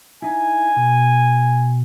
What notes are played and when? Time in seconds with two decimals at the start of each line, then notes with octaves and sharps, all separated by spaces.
0.22 D#4 E4 G#5
0.76 B2